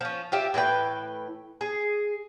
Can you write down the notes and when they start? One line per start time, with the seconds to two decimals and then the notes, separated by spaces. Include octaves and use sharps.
0.01 F3 C#4
0.32 F4 G4 E5
0.54 A2 E3 B4 G5
1.61 G#4